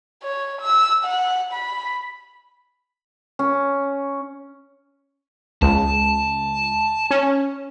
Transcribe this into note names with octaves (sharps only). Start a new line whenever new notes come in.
C#5
E6
F#5
B5
C#4
C#2 A5
C#4